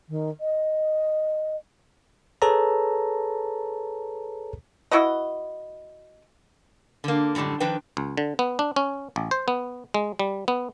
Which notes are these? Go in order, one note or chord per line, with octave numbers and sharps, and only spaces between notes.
D#3
D#5
G#4 A4 B4 C#5 A5 A#5
E4 F#4 B4 D#5
D3 A#3
F#2 A2 D3 G3 G#3
D#3 F3 D4 B4 G5
C#2
D3
B3
D4
C#4
A1
C5
B3
G#3
G3
B3